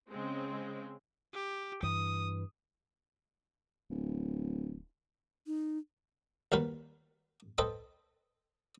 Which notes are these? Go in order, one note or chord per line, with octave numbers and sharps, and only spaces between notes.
C#3 G#3 C4
G4
G2 E3 D#6
D1
D#4
D#2 G3 F#4 A#4 B4
A4 B4 C5 D#5 G5 A5